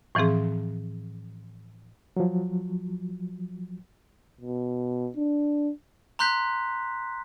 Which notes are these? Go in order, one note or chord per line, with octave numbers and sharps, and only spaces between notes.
A2 E3 F3 C4 G#4
F3 F#3
B2
D4
A#5 C6 F#6 G6 B6